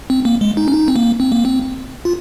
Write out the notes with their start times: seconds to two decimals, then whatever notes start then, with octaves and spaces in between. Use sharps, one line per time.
0.10 C4
0.25 A#3
0.41 G#3
0.57 D#4
0.68 C#4
0.73 D#4
0.88 C4
0.96 A#3
1.20 C4
1.32 A#3
1.45 C4
2.05 F4